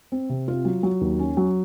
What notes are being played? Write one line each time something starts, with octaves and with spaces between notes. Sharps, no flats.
C4
C3
F4
F#3
F#3
D#2
C#4
F#3